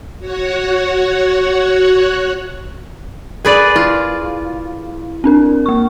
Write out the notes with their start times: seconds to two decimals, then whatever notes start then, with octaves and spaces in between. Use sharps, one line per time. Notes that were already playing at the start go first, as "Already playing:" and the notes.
0.19 F#4 C#5 F#5
3.45 G#4 A#4 B4 D5
3.76 E4 F4
5.24 C4 D4 A#4
5.66 A#3 C#6